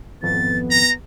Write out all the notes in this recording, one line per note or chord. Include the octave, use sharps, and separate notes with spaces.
G#1 F2 B3 A6
A#5 A#6